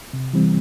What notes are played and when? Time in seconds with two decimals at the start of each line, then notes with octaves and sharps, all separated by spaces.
0.13 C3
0.33 E3 G3 C4